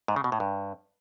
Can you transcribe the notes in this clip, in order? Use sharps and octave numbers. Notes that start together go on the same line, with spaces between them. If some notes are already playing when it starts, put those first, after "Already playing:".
G#2
C#3
B2
A2
G2